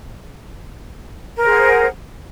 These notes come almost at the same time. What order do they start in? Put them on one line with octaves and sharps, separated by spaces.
A#4 C5 G#4 F#5